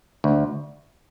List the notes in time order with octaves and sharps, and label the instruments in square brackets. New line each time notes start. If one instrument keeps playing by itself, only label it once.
[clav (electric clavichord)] D2